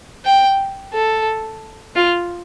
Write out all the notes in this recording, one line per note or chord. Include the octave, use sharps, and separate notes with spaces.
G5
A4
F4